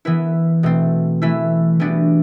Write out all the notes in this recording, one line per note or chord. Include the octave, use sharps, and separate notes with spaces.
E3 B3 E4 B4
B2 A3 C4
E3 A3 E4 B4
E3 G3 B3 D4 F#4